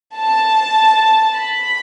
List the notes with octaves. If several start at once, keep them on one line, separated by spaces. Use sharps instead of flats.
A5
B5